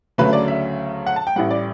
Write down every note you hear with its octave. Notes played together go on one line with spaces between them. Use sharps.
D2 C#3 F#3 A3 B4
D5
E5
F#5
A5
G5
A1 A2 E3 G3 F#5
D5